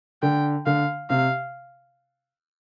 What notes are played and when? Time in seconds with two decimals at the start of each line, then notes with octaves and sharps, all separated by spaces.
0.22 D3 G5
0.66 D3 F5
1.10 C3 F5